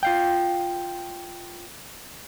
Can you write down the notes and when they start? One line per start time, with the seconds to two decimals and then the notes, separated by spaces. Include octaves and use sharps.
0.03 F4 F5 G5